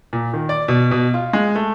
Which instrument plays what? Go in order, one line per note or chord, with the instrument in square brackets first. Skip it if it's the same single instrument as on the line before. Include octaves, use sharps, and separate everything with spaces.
[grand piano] A#2
D#3
D5
B2
B2
F4
G#3
A3